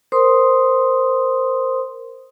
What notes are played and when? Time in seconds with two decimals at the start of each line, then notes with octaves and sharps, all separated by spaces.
0.12 A#4 C5 C6 D#6